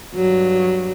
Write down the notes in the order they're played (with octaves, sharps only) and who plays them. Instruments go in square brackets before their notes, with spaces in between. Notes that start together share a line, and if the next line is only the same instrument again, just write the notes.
[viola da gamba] G2 F#3